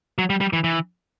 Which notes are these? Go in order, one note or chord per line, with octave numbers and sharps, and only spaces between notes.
F#3
G3
G3
E3
E3